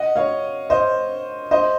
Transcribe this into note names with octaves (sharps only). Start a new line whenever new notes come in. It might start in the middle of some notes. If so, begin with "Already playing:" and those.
Already playing: D#5 F#5
C#5 F5
C5 D#5
C5 D#5